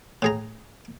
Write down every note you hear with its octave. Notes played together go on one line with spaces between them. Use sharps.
A2 G#4 A#5